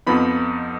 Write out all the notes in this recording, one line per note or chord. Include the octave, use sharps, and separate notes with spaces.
F2 F3 B3 D#4 B5